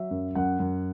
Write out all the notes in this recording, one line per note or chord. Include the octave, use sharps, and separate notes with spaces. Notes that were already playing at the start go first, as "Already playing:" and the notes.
Already playing: F#3 E5
F#2
F#2 F#5
F#2